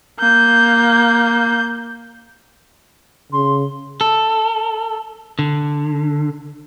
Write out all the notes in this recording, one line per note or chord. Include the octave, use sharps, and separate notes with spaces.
A#3 G6
C#3 C6
A4
D3